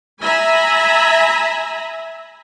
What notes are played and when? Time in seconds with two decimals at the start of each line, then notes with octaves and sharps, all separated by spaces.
0.21 E5 G#5 A#5 B5